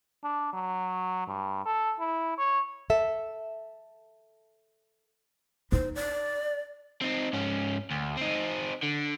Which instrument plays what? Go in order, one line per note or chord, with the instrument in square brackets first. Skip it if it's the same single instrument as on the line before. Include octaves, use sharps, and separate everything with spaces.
[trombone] D4
F#3
G2
A4
E4
C#5
[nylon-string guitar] A4 E5
[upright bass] D#4 [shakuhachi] C5
[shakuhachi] D5
[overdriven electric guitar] C4 D#4
G#2 C#4
D2
C4 D#4
D3